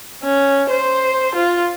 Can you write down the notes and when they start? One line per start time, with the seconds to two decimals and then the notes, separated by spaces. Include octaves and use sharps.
0.23 C#4
0.70 C5
1.35 F4